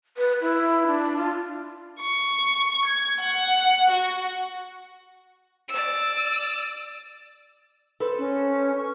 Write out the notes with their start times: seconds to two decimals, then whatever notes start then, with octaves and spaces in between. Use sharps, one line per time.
0.17 B4
0.41 E4
0.87 D4
1.17 F4
2.00 C#6
2.85 G#6
3.21 F#5
3.90 F#4
5.69 D5 E6
8.00 A4 B4 C5
8.19 C#4
8.77 C#6